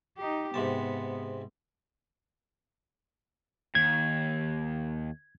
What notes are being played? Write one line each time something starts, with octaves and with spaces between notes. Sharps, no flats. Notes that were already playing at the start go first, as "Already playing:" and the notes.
D#4 G4
G#2 C3 B3 A5
D#2 G#6